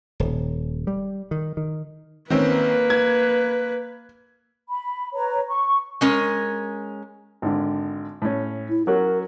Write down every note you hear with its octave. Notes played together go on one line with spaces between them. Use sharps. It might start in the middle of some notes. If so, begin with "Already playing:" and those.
D#1
G3
D#3
D#3
D#3 A#3 C4 C#4 B4
G#6
B5
B4 C#5 A#5
C#6
G#3 C#4 A#4
G#1 D3
A2 C#4
E4
F#3 C#4 F#4 A#4